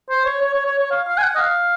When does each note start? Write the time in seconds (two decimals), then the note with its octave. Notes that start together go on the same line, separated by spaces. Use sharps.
0.09 C5
0.25 C#5
0.41 C#5
0.53 C#5
0.66 C#5
0.78 C#5
0.91 F5
1.07 F5
1.17 G#5
1.23 F#5
1.35 D#5
1.39 F5